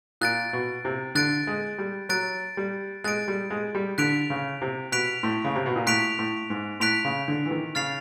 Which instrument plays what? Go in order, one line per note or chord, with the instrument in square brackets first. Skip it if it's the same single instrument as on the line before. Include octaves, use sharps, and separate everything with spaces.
[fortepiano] A#2 [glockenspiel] F#6 A6 D7
[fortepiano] B2
C3
[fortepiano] D3 [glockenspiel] F#6 A6 D7
[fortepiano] G#3
G3
[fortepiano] F#3 [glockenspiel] F#6 A6 D7
[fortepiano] G3
[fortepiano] G#3 [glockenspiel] F#6 A6 D7
[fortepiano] G3
G#3
G3
[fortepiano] D3 [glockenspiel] F#6 B6 D7 F7
[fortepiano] C#3
C3
[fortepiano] B2 [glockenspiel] F#6 B6 D7 F7
[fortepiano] A2
C#3
C3
B2
A#2
[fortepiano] A2 [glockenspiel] F#6 B6 D7 F7
[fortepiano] A2
G#2
[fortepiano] A2 [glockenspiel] F#6 B6 D7 F7
[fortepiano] C#3
D3
E3
D#3
[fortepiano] C#3 [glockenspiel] F6 A6 C7 F7